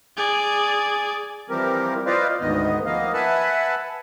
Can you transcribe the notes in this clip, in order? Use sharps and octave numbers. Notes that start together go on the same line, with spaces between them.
G#4 D5
E3 F3 G3 C4 G4 A#4
F4 B4 C5 D5 D#5 F5
D2 G#2 D#3 B3 D#5
F3 A#3 B3 D#5 F5
B4 E5 F#5 G#5 A5 B5